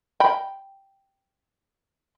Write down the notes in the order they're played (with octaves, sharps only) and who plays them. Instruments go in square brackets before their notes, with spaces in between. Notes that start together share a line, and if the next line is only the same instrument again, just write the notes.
[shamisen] G5 B5